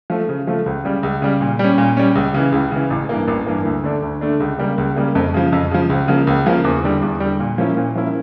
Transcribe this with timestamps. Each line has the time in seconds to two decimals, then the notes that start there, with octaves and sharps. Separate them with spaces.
0.10 F3 A3
0.29 C#3
0.47 F3 A3
0.66 C#2
0.85 C#3 G3
1.03 C#2
1.22 C#3 G3
1.41 A#2
1.59 G3 C#4
1.78 A#2
1.97 G3 C#4
2.15 C#2
2.34 C#3 E3
2.52 C#2
2.72 C#3 E3
2.90 A1
3.09 G2 E3 A#3
3.28 A1
3.46 G2 E3 A#3
3.65 D2
3.84 D3 A3 D4
4.02 D2
4.21 D3 A3 D4
4.40 C#2
4.59 C#3 G3 A#3
4.78 C#2
4.96 C#3 G3 A#3
5.15 F2
5.34 C#3 F3
5.52 F2
5.71 C#3 F3
5.90 C#2
6.08 C#3 F3 A#3
6.27 C#2
6.46 C#3 F3 A#3
6.64 E2
6.83 D3 G3
7.02 E2
7.20 D3 G3
7.40 A#2
7.58 F3 A#3 C#4 E4
7.77 A#2
7.95 F3 A#3 C#4 E4